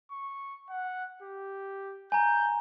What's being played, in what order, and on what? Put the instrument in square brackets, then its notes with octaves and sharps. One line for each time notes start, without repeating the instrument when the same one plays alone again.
[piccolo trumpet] C#6
F#5
G4
[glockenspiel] G#5 A#5 [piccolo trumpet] G6